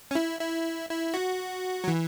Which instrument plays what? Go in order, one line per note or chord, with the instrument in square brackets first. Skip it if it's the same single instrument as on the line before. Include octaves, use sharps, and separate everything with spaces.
[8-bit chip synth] C#4
E4
E4
E4
F#4
F#3
E3